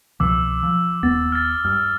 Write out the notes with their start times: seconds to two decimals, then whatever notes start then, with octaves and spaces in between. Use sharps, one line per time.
0.20 C2 B2 F3 D6 E6
0.63 F3
1.03 D#1 B3 A6
1.32 F6 A6
1.65 G2 F6